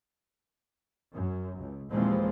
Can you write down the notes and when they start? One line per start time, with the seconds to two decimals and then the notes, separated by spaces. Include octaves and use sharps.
1.14 F#2
1.59 C#2
1.91 D#2 A#2 E3 F3 G#3 C4